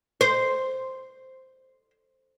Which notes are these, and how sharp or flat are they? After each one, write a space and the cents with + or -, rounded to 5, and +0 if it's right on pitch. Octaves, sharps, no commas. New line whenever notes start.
C5 -5